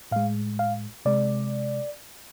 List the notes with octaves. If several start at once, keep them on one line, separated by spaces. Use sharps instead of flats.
A2 G#3 F5
F5
C3 G#3 D5